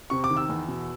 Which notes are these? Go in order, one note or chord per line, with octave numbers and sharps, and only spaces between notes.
C3 C#6
D6
D#3
E6
E2
B2